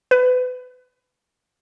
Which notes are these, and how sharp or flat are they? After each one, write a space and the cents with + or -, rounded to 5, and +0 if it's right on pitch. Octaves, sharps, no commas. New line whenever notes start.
B4 +30